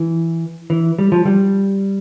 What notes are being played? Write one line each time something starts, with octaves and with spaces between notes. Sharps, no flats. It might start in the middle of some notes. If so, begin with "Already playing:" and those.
Already playing: E3
E3
G3
F3
G3